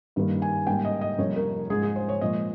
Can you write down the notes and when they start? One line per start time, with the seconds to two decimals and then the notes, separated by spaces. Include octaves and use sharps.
0.16 G2 D#3 G3 A#3
0.42 G#5
0.67 G#2 G3 A#3 G5
0.85 D#5
1.01 D#5
1.18 F2 C3 G3 A#3 C#5
1.36 A#4
1.70 G#2 F3 G#3 G#4
1.83 G#4
1.96 C5
2.09 C#5
2.21 A#2 F3 G#3 D#5